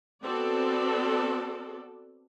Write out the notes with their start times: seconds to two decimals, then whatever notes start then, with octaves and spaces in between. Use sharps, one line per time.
0.24 B3 C4 F#4 A4 D5